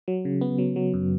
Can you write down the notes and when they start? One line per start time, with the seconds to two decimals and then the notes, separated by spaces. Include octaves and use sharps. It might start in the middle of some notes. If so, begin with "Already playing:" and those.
0.08 F#3
0.25 C#3
0.41 B3
0.58 F#3
0.76 F#3
0.94 F#2